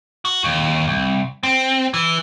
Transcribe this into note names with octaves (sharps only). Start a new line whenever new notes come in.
F#4
D#2
C2
C4
E3